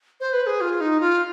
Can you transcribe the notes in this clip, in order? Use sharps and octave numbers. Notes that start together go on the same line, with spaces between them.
C5
B4
G#4
F4
D#4
F4